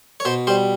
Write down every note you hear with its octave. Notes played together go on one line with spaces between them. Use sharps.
C#5
B2 C5
G3 C5